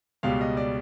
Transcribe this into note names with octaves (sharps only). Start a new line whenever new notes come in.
C#2 B2 G3 F5
D#5
D5